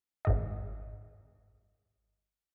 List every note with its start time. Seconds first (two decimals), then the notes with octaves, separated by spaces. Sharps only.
0.25 G#1 G#2 D#5